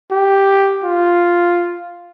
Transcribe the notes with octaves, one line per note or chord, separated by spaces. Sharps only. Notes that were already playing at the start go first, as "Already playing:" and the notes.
G4
F4